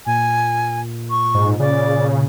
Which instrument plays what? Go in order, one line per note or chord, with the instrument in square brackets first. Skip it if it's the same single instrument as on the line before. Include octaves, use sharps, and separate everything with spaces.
[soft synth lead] A#2 [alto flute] G#5
[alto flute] C#6
[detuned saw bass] G#2
[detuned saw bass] C#3 [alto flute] D5